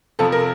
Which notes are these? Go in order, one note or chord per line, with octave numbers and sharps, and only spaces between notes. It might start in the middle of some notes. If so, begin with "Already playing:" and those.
F2 C3 F3 A4
A#4